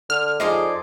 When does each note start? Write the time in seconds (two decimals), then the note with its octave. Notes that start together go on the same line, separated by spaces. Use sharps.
0.10 D3 F6
0.40 F2 D#4 G#4 D5 C6